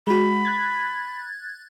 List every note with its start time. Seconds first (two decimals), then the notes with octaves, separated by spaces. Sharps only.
0.07 G#3 F#4 B5
0.45 F#6 G#6 A6